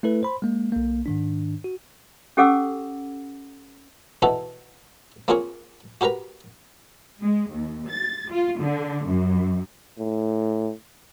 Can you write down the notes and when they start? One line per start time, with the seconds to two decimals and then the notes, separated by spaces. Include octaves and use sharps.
0.03 A3 E4 A4 B4
0.23 C5 B5 C6
0.42 G#3 A#3
0.72 B1 A#3
1.06 G#2 D#3 D4
1.64 F#4
2.37 C#4 G4 A4 F#5 D6 E6
4.22 B2 E3 D#4 F#4 A4
5.28 A#3 C4 F4 G#4 A#4 C#5
6.01 F#4 G4 A#4 B4 A#5
7.21 G#3
7.51 D#2
7.89 A6
8.32 F4
8.62 D3
9.07 F#2
9.99 A2